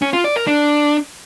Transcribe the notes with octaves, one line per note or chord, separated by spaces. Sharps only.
C#4
F4
D5
A#4
D4